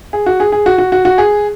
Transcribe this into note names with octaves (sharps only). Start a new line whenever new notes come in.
G#4
F#4
G#4
G#4
F#4
F#4
F#4
F#4
G#4